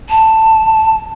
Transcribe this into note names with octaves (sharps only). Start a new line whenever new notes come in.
A5